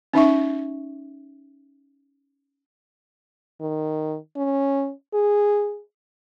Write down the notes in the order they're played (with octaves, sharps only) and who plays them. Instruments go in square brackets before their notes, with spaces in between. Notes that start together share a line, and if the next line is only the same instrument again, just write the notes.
[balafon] C#4 D#4 E5 C#6
[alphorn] D#3
C#4
G#4